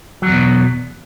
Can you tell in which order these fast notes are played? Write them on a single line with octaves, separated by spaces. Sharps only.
F#3 E2 B2